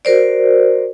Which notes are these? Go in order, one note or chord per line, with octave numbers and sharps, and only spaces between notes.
F#4 A#4 C5 D5